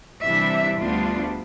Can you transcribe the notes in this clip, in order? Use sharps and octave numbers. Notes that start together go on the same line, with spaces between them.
C3 E3 G3 D4 E5
D2 D3 G3 B3 D4 F4